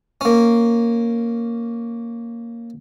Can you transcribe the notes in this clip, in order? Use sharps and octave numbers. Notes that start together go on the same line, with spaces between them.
A#3 C#4